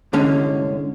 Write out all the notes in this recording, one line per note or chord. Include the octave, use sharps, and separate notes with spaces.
C2 G2 D3 G#3 C#4